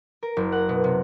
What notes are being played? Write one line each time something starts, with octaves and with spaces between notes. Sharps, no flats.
A#4
F#1
F#5
B2
C3